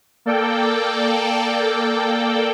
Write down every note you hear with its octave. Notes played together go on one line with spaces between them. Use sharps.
A#3 A4 D5 G5